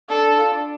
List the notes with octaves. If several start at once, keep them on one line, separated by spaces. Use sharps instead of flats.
D4 A4
D4
F4
D4